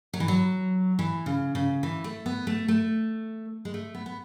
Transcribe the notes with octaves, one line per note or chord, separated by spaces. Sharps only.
F#3
E3
F#3
E3
C#3
C#3
E3
A3
B3
A3
A3
G#3
A3
B3
B3